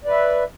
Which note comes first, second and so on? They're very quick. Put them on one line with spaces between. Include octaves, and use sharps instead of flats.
D5 B4 E5